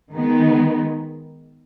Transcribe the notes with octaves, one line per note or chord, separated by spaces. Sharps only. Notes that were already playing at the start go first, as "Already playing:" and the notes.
D#3 G#3 B3